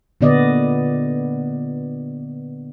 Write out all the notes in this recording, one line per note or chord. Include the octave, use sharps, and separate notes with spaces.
A#2 D3 B3 D5 D#5